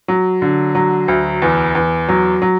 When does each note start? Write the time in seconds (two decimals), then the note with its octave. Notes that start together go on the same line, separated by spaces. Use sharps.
0.08 F#3
0.42 D3
0.75 F#3
1.08 D2
1.42 E2
1.75 E2
2.09 F#3
2.42 F#3